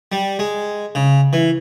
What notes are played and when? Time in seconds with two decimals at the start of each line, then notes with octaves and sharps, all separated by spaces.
0.12 G3
0.39 G#3
0.95 C#3
1.33 E3